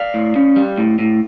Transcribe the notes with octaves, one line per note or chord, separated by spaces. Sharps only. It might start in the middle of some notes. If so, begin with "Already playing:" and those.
Already playing: D5 F5
A2
C#4
G3
A2
A2